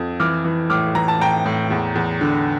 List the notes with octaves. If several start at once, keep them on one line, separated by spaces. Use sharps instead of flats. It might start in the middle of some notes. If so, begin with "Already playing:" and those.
Already playing: F2
E3 D6 F6
E3
A2 D6 F6
E3 A#5
A5
A2 G5 A#5
A2
E2
E2
D3